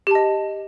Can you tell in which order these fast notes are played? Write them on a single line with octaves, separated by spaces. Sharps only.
G4 A5 D#5